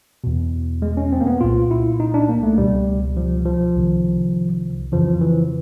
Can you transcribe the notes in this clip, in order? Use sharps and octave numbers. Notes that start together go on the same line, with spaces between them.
E2 B2
G#3
C#4
C4
A#3
B3
C2 A#2 F4
E4
D#4
D4
A#3
A3
C#2 B2 G3
F3
F3
C2 C3 D#3
F2 C#3 E3 F3
E3